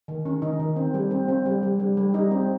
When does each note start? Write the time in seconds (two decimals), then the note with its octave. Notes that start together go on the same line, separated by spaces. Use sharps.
0.08 D#3
0.25 C#4
0.42 D#3 D#4
0.60 D#3
0.76 C4
0.94 G3
1.11 C4
1.28 C4
1.46 G3
1.63 G3
1.80 G3
1.97 G3
2.14 G3 D#4
2.31 C4